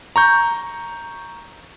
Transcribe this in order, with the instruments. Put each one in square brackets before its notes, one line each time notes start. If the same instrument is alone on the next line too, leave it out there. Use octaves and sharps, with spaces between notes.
[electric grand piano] A#5 C#6 G6